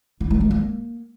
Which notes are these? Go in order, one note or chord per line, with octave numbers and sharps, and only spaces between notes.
E4
A3
A3
A#3